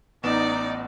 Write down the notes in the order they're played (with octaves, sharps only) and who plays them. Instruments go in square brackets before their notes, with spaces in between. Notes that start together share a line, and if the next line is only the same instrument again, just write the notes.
[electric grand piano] A1 B3 E7 [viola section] D#4 [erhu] D5